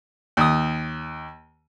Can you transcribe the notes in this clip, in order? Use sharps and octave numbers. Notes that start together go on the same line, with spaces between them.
D#2 D#6